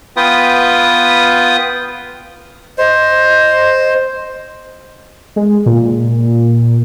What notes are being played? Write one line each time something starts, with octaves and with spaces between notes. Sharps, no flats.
B3 F4 B4 G5 D#6
C5 D#5
G#3
A#2